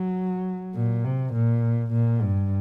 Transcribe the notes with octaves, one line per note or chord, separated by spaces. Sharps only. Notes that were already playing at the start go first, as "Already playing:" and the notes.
Already playing: F#3
A#2
C3
A#2
A#2
G2